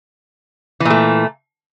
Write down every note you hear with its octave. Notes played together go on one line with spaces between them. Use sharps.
A#2 E3 A3